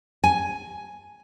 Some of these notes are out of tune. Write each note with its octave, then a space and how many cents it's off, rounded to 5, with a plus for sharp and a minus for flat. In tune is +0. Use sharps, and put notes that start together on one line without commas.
G#5 +5